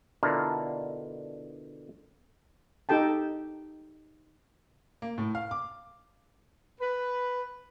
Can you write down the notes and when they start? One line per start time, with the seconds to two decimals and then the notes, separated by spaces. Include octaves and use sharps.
0.23 B2 D3 D4 E4 F4 A#4
2.89 D#4 G4 A4 G5 A5
5.02 A#3
5.18 A2
5.35 F5
5.51 D6
6.81 B4